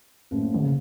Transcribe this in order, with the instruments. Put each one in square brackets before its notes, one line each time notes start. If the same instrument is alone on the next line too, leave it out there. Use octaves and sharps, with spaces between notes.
[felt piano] F#1 A2
[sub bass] C#3